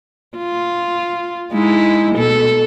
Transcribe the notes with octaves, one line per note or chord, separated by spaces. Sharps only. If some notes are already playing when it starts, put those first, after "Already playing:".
F4
G#3 D#4 E4
B2 A4